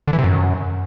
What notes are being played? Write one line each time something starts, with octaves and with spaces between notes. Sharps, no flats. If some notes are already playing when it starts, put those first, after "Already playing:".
D3
E3
C3
F#2